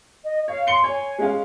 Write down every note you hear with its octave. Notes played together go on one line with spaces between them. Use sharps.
D#5
C#5 F5
C6 C7 C#7 G7
C#5 G#5
G#3 C#4 F5